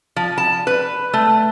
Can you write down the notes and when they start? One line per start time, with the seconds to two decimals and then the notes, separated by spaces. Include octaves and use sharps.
0.16 F3
0.38 A5
0.67 B4
1.14 A3